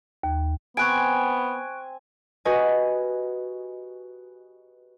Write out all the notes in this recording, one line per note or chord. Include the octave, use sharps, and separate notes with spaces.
D#2
B3 C4 G#5 C6 C#6 F#6 D7
F#4 G4 B4 D#5 G#5